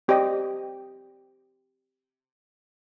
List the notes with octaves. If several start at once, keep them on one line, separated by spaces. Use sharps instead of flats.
C4 G4 C5 D5 D#5 G5